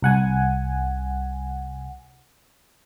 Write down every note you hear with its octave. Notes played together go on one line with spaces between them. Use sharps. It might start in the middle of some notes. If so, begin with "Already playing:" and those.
C2 F#5 G#5